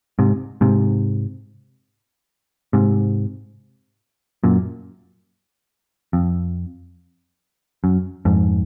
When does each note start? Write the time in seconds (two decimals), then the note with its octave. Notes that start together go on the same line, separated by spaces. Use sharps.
0.19 G#2 C3
0.61 G#2 C3
2.73 G#2 C3
4.44 F#2 A#2
6.13 F2
7.84 F#2
8.25 F2 G#2